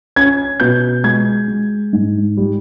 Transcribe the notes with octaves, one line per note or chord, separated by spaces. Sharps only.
C#4 G#6
B2 G6
G#3 G#6
G#3
G#2
G3